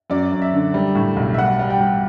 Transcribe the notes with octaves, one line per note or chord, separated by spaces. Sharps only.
F#2 D5
F#2
E5
D3
G3
A2
B1
E5
G3 F#5
G3
G5
G3